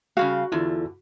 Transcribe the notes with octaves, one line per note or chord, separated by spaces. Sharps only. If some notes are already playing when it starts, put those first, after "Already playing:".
C#3 G3 F#4 F5
E2 D3 E4 F4 A4